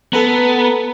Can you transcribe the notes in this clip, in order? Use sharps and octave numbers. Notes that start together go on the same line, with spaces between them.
B3 A4 B4 A#5